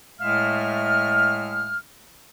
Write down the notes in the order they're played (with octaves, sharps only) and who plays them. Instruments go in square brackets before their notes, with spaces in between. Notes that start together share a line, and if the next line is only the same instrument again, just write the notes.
[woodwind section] A2 G#3 A3 E5 F5 F6